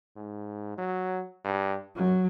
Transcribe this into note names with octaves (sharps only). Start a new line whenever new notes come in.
G#2
F#3
G2
F#2 F#3